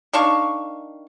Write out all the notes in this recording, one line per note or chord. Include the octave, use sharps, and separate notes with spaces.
D#3 D4 F5 C#6